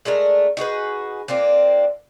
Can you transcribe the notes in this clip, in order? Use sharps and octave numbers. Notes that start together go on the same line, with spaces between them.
G#3 A3 D4 A#4
D#4 F#4 G#4 B4
A#3 C4 D4 F4